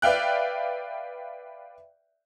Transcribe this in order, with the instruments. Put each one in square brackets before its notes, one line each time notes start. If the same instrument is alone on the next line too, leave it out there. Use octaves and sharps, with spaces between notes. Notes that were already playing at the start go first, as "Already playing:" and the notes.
[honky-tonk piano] B4 D5 E5 F5 G5 F#6